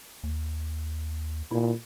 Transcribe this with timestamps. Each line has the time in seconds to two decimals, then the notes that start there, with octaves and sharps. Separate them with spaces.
0.23 D#2
1.51 A#2 E4